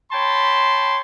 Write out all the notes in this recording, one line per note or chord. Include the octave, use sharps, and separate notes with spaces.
C#5 G5 A5 B5 C6